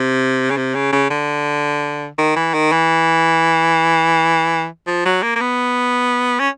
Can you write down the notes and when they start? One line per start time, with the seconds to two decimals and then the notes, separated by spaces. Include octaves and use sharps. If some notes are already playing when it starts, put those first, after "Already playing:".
Already playing: C3
0.50 C#3
0.57 C3
0.75 C#3
0.92 C#3
1.11 D3
2.18 D#3
2.36 E3
2.54 D#3
2.72 E3
4.87 F3
5.06 F#3
5.23 A#3
5.36 A#3
5.41 B3
6.39 C#4